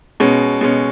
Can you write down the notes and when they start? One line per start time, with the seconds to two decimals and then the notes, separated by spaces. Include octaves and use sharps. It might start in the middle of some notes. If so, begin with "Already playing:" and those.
0.20 B2 G#3 C#4
0.61 B2 G#3 C#4